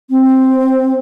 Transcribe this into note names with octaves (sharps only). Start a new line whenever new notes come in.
C4